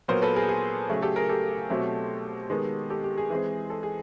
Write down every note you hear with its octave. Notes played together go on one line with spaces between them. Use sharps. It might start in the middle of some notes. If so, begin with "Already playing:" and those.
A#2 F#3 B3 A#4 C5
A4 B4
G#4 A#4
G#4
C#3 F#3 A3 G#4
G4 A4
G#4 A#4
G4 A4
B2 F#3 A3 C4
D#3 G#3 B3
G4 A4
G4
G#4
E3 G#3 C4
A4
G#4